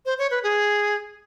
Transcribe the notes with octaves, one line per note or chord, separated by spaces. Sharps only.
C5
C#5
B4
G#4